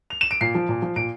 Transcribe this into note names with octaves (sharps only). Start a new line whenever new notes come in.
F7
E7
D7
A#2 C7
F3
A#2
F3
A#2 D7